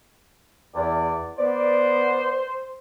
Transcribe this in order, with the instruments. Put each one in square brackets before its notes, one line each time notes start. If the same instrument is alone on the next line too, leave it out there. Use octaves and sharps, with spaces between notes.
[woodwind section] E2 [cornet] D5
[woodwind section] B3 D5 [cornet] C5